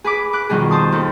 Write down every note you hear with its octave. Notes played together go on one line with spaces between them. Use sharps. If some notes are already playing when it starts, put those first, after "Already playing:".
G#4 B4 B5 D6
B4 D6 F#6
F2 B2 D#3 G3 G#4
C5 A5 C6 D#6
D#2 A4